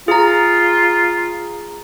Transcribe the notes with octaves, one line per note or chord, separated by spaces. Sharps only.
F4 G#4 A#5